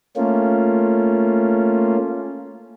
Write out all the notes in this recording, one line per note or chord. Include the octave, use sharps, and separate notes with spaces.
A3 A#3 C#4 F4